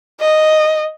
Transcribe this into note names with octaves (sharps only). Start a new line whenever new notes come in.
D#5